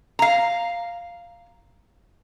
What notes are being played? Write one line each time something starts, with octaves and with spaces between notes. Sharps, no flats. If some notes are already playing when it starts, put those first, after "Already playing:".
F5 A#5